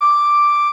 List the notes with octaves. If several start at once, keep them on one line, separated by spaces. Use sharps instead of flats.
D6